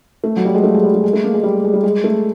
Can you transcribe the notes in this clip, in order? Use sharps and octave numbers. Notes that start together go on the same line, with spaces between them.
A3
F#3
G3
G#3
A3
G#3
G3
G3
G#3
A3
A#3
G#3
G3
G#3
G3
G#3
A3